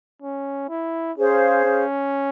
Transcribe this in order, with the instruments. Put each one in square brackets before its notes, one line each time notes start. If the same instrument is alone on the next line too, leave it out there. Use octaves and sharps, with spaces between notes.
[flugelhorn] C#4
E4
[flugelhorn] C#4 [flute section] G#4 C5 F5
[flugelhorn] C#4